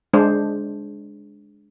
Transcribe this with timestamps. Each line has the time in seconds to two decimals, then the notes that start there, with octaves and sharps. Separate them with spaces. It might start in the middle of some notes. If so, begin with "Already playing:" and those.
0.13 G#3 D4 C5